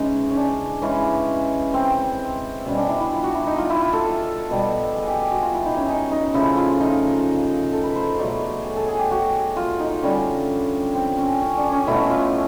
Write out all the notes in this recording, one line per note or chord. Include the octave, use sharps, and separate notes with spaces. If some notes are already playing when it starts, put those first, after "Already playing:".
Already playing: C#3 E3 G#3 C#4 D#4
C#4
D4
C#3 E3 G#3 C#4
C4
B2 G3 C#4
D4
E4
E4
F4
F#4
E4
D#4
F4
E4
F4
A4
B2 G3
G#4
G4
G#4
F#4
F4
E4
D#4
C#4
D#4
D#4
C#3 F3 A3 E4
F4
D#4
A4
B4
C5
C#5
B2 F#3 A3 D5
C#5
G#4
A4
G#4
G4
F#4
F4
D#4
D3 G3 C#4
C4
C#4
C#4
D4
C#4
B2 F#3 A3 E4
F4